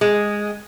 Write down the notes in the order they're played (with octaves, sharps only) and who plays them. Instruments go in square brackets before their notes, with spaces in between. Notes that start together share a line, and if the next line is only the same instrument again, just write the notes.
[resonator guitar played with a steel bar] G#3